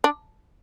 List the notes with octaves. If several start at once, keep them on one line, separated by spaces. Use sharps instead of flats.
D4